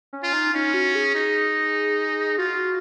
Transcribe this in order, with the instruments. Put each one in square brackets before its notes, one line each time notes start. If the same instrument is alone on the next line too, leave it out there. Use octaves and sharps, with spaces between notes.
[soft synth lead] C#4
[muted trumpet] F4
[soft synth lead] D#4
[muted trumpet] C#4 [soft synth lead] D#4
[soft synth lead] F#4
G#4
[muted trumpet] D#4
[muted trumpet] F4 [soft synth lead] F#4